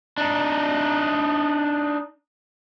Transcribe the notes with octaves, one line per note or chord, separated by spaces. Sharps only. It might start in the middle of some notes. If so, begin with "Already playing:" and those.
D4 D#4